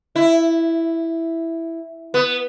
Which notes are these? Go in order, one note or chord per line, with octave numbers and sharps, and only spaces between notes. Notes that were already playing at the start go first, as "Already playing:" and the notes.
E4
B3